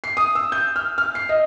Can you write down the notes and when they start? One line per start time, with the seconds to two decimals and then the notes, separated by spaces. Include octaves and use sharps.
0.04 C7
0.17 D#6
0.35 E6
0.52 G6
0.76 F6
0.98 F6
1.15 C7
1.29 D#5